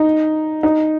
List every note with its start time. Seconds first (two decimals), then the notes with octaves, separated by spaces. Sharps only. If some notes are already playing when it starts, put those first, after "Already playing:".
Already playing: D#4
0.63 D#4